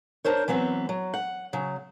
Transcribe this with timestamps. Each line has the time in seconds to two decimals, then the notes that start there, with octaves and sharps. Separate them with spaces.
0.24 D4 A#4 C5 C#5
0.48 E3 F#3 B3 C4
0.89 F#3
1.14 F#5
1.53 C#3 F#3